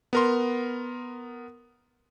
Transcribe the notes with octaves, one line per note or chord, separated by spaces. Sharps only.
B3 A#4 C6